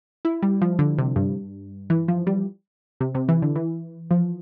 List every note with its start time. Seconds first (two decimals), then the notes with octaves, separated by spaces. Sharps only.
0.25 E4
0.42 G3
0.61 F3
0.79 D3
0.98 C3
1.16 G2
1.90 E3
2.08 F3
2.27 G3
3.00 C3
3.15 C3
3.28 E3
3.42 D3
3.56 E3
4.11 F3